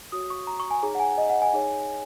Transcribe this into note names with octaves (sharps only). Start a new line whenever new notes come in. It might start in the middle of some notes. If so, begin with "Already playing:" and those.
F#4 C#5 D#6
C#6
A#5
C#6
G#5
D#4 G#4 C#5 A#5
F#5
G#5
D#5
F#5
G#5
D#4 G#4 C#5